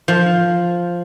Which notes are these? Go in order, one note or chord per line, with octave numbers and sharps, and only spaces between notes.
F3